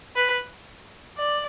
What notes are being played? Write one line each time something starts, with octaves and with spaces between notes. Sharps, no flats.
B4
D5